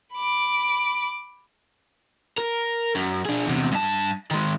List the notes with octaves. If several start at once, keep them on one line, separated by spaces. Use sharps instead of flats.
B5 D6
A#4
F#2
D4 G#4
E2 C3
G2 A5
D#3 G#3